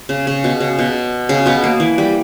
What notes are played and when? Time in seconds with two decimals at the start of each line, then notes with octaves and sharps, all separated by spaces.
0.09 C#3
0.27 C#3
0.44 B2
0.61 C#3
0.79 B2
1.29 C#3
1.46 B2 B3
1.64 A#3
1.80 E3
1.98 G3